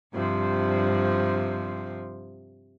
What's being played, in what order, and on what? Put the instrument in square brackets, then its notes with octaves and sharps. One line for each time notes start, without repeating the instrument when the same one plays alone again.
[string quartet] G2 C3 F3